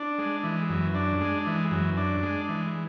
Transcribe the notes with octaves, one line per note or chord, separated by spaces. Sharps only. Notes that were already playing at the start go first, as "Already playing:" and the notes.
Already playing: D4
G#3
E3
F#2
D4
G#3
E3
F#2
D4
G#3
E3